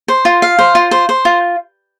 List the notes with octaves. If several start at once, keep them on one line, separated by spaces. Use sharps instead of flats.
C5
F4
F5
C5
F4
C5
C5
F4